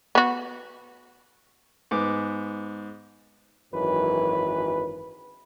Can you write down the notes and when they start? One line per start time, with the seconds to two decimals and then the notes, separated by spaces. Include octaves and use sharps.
0.15 B3 F#4
1.91 G#2 B3 D6
3.73 G#1 F#2 E3 F#3 B4